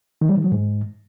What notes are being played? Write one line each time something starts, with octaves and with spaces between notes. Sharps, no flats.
D#3
G3
D#3
F#3
G#2